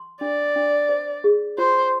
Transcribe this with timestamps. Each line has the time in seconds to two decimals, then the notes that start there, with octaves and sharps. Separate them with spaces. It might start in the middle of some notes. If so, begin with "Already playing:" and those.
Already playing: C6
0.21 D4 D5
0.56 D4
0.89 C5
1.24 G#4
1.58 F4 C5